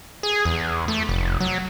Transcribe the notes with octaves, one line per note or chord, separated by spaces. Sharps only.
G#4
E2
A3
F1
F#3